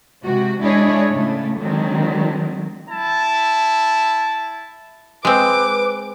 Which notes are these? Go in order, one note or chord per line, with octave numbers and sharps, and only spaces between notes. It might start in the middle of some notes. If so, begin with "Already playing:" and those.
C3 G#3 F#4
G#3 D4 E4 G#4 C#5 D#5
A2 C#3 A3
D3 D#3 F#3 G#3 C4
E4 A5
G#3 C4 B4 D6